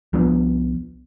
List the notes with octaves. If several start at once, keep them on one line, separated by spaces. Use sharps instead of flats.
C2 F3 B3 D4